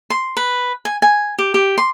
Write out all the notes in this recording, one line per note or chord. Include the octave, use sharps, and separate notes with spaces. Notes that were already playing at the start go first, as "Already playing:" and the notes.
C6
B4
G#5
G#5
G4
G4
C6